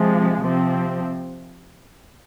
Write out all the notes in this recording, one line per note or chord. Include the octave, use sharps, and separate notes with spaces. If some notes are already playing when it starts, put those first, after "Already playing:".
Already playing: C3 F3 G#3
C3 F3 C4